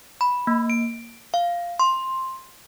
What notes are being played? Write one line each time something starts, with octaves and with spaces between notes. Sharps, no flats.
B5
A#3
D7
F5
C6